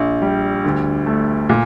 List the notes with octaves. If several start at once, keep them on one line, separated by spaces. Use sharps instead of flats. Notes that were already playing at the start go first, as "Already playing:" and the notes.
Already playing: A#1
G3
D2
A3
A#2